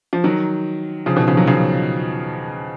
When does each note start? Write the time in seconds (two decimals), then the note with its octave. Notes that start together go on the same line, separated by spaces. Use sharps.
0.13 F3
0.24 D#3 F#3
1.06 C#3 F3
1.16 B2 D#3
1.27 C#3 F3
1.37 D#3 F#3
1.47 C#3 F3